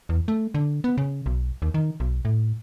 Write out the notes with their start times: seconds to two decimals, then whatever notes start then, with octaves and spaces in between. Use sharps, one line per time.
0.09 E2
0.28 A3
0.54 D3
0.84 B3
0.98 C#3
1.26 B1
1.62 D#2
1.74 D#3
2.00 B1
2.25 A2